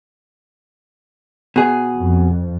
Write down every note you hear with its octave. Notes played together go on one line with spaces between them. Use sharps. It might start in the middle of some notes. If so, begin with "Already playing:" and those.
B2 G#4
F2